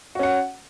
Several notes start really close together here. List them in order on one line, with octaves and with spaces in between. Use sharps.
F#4 C#4 F#5